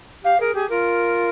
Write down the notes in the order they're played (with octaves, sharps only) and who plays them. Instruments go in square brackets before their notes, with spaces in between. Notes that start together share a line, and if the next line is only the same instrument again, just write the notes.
[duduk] G4 [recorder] F5
[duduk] G#4 [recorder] A#4
[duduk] G4 [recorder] G#4
[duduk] F4 [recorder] A#4